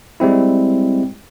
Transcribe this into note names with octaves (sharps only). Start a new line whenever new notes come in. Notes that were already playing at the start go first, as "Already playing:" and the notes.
G3 G#3 C4 E4